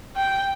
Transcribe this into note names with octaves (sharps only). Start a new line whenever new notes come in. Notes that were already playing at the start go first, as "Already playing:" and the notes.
G5